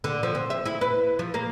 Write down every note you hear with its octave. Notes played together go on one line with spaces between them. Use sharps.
D3
F3
C4
E5
E4
B4
F3
A#3